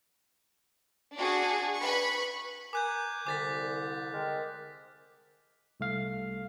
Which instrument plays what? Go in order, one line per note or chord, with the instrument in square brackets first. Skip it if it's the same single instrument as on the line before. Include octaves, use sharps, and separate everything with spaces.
[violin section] D4 F#4 G#4
B4 B5 C#6
[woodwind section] A#4 G#5 [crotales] D6 F#6 G6
[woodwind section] C2 D3 [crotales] D6 A6 B6
[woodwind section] G#3 C4 A#4
[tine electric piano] C2 A3 F5